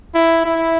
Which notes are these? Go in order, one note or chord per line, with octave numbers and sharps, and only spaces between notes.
E4
E4